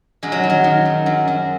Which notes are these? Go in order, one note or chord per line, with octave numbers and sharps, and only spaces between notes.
F#2 G#3
F#3
D#3
F#3
D#3
F#2
F#2
F#2